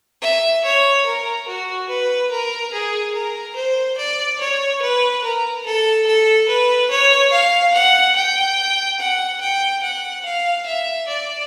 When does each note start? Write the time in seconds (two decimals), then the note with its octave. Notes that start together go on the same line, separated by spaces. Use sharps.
0.22 E5
0.65 C#5
1.06 A#4
1.47 F#4
1.89 B4
2.31 A#4
2.73 G#4
3.14 A#4
3.56 C5
3.98 D5
4.40 C#5
4.82 B4
5.24 A#4
5.66 A4
6.07 A4
6.48 B4
6.90 C#5
7.32 F5
7.74 F#5
8.16 G5
8.99 F#5
9.41 G5
9.83 F#5
10.25 F5
10.66 E5
11.08 D5